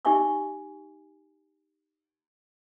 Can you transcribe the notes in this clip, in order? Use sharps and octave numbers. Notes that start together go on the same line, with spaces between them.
D#4 G4 E5 G#5 C#6 D6